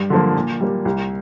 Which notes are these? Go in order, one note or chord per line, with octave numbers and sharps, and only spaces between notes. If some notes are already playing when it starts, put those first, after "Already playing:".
Already playing: G2
D3 F3 A#3
A#2
G3 A#3
C2